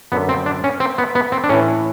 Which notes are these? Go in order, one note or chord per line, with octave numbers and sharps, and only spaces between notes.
F#2 D3 B3
C4
D4
C#4
C4
B3
B3
C4
D4
A2 E3 C#4